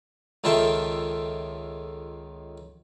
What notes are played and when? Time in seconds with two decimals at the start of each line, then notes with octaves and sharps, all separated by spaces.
0.44 C#2 D#3 F4 A4 E5 G5